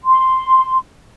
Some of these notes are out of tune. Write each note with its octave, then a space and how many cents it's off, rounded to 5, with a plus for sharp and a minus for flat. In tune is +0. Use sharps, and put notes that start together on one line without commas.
C6 +0